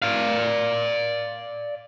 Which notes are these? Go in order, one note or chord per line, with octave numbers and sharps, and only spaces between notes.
D5 F5